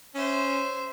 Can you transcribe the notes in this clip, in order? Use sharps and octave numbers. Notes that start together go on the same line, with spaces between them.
C#4 C5 E5